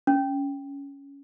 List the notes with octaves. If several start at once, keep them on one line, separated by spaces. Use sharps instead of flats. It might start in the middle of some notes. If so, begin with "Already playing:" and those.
C#4